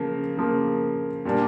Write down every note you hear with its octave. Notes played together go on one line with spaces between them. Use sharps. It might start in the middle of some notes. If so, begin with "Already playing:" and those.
Already playing: C#3 F3 A#3
C#3 F3 A#3
A#2 G3 A#3 D4